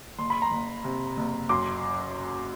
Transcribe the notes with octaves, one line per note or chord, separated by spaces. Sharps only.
F#1 C6
B5
A#5 C6
F#1
C3
F#1
F#2 C6 D6